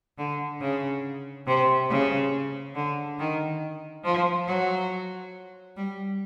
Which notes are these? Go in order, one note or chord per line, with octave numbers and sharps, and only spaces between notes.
D3
C#3
C3
C#3
D3
D#3
F3
F#3
G3